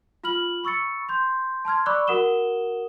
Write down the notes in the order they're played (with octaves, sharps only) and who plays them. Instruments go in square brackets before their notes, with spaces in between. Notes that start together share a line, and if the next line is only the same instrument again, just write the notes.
[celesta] F4 B5 F6 F#7
B5 C#6 E6 A6 C#7
C6 G6
A5 C6 F6 G#6
D5 B5 C#6 D6 E6 F#6
F#4 A#4 F#5 D#6 E7 G7